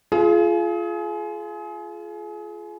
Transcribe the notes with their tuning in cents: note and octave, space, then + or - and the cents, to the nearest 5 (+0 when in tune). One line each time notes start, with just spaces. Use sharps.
F4 -20 G#4 +30